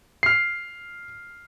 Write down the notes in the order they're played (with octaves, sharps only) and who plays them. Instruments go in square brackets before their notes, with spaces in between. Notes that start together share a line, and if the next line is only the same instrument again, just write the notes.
[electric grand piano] F6 C7